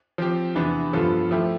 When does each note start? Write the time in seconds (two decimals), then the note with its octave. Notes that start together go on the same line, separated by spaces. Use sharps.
0.18 F3 C4 G4
0.55 E2 C3 E3 B3 D4
0.93 G2 F3 B3 F4 A4
1.31 F3 A3 E4 G4